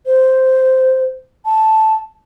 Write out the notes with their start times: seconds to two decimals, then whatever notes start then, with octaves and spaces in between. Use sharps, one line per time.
0.06 C5
1.45 A5